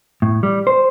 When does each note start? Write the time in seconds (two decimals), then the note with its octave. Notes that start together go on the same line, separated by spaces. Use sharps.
0.22 A2
0.43 G3
0.67 C5